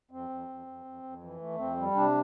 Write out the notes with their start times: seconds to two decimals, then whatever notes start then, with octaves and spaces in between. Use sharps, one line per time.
0.11 F2 C4
0.29 F2
0.48 F2
0.67 F2
0.85 F2
1.03 F2
1.22 E3
1.40 A3
1.58 F2 C4
1.77 G3
1.94 C3 D4